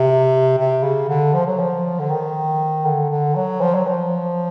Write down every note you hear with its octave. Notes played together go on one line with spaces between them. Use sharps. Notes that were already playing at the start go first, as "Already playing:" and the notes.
Already playing: C3
C3
C#3
D3
F3
F#3
F3
D3
D#3
D3
D3
F#3
F3
F#3
F3